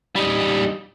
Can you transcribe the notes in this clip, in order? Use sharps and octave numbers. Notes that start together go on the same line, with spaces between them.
G3 D#4